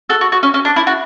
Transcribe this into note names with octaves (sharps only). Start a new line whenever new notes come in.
F#4 A4
F#4
F#4
C#4
C#4
D4
E4
F#4